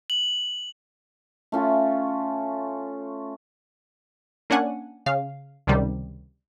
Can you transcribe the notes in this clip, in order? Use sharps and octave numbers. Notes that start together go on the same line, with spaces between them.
F#7
A3 C#4 F4
A#3 C#4 D4 F#5 G#5
C#3 F5
C#2 C3 D#3 G3